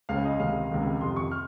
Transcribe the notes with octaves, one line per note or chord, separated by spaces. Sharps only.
C#2 C#3 F5
D#5
C#2 C3 D#3 F5
C#2 C3 D#3
F2 C3 D#3 C6
C#6
F6